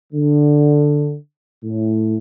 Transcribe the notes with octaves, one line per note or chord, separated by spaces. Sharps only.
D3
A2